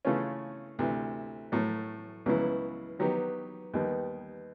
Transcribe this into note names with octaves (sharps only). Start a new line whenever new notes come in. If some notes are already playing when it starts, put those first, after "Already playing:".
C#3 E3 A3 C#4 F4
D2 C3 E3
A2 F#3 A3
C#2 C#3 F#3 B3 E4
D#3 F#3 B3 D#4 G4
D#2 D#3 G3 B3